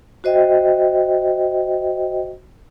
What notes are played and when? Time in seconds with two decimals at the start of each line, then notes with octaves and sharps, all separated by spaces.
0.24 F#4 C5 D#5 E5 G5